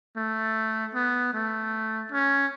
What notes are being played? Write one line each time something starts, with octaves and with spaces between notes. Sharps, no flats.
A3
B3
A3
C#4